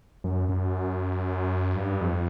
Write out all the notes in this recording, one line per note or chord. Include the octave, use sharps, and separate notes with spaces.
F#2
F#2
G2
F2